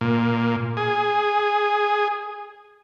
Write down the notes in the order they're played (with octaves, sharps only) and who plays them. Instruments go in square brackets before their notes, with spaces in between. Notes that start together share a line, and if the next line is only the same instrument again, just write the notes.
[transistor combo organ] A#2
G#4